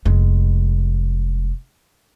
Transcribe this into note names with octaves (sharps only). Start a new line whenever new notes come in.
F1 G#3